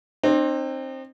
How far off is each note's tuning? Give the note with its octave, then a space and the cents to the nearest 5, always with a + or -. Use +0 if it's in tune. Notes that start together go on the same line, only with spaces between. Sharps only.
C4 +20 D#4 -40